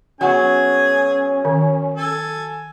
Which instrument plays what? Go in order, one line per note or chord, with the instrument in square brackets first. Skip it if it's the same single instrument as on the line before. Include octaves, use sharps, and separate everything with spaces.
[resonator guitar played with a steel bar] F#3 B3 F#4 [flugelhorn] C#4 [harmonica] G#4 G#5
[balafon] D#3
[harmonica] A4 G#5